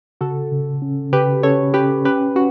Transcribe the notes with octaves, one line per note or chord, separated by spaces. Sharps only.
C#3 F#4 A4
C#3
C#4
C#3 G4 B4
C#4 A4 C#5
C#4 G4 B4
C#4 G4 B4
C#4 F#4